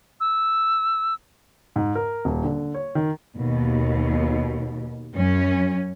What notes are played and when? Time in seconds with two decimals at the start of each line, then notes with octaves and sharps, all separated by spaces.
0.20 E6
1.76 G#2
1.95 A#4
2.25 D#1
2.44 D3
2.74 C#5
2.95 D#3
3.37 D#2 B2
5.16 F#2 C#4